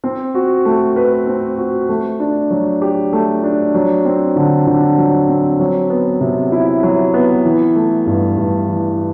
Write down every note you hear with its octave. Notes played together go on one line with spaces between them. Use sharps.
C4
F#4
A3
B4
C4
F#4
A3
D4
F#3
G4
A3
D4
F#3
C4
D3
D3
F#3
C4
F#3
B3
C3
E4
F#3
B3
E3
A3
G2
G2
E3